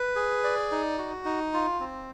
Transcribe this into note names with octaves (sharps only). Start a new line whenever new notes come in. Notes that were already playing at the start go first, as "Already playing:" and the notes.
Already playing: B4
G#4
D5
D#4
F#4
D#4
F4
C4